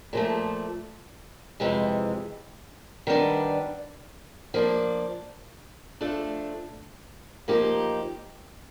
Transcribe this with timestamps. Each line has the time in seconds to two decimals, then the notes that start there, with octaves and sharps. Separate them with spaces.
0.13 A#2 F3 A3
1.60 F2 C3 E3 G#3
3.07 D#3 G3 B3 D4
4.54 F3 A#3 D4
6.01 F3 A3 D4
7.48 F3 A#3 D#4 G4